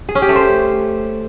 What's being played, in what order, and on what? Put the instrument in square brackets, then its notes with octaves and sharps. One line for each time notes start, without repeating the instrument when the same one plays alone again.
[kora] G#4
C#4
G4
A3
C5